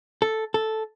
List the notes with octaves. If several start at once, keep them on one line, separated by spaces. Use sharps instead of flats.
A4
A4